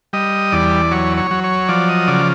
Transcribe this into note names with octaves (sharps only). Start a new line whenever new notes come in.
G3 D#5
E2 D5
F#3 C#5
C#5
F#3
C#5
F3 D5
D#5
C#3 D5